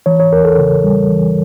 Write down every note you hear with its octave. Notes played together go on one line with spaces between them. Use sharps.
E3 C#5
C#5
E2 A#4
A4
C#3
G3
E3